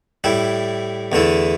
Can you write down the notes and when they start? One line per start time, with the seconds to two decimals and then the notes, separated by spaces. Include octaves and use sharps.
0.24 A2 G3 E4
1.12 E2 D3 A3 E4